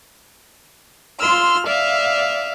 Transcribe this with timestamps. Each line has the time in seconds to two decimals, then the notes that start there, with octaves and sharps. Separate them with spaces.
1.19 F4 C6 E6 F6
1.66 D5 E5 F5